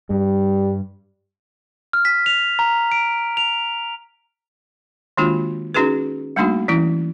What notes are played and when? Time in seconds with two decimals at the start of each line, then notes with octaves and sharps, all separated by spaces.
0.10 G2 G3
1.93 F6
2.05 B6
2.26 F7
2.59 A#5
2.92 D7
3.37 F7
5.17 D#3 G#3 A#3 D4 F4 F#4
5.74 C#4 D#4 F#4 G#4 B4
6.36 G3 A3 A#3 D4 D#4 F#4
6.68 E3 C#4 E4